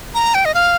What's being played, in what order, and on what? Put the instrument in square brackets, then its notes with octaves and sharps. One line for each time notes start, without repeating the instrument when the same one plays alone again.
[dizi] A#5
G5
D#5
F5